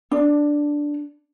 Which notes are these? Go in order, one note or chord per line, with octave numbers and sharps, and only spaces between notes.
D4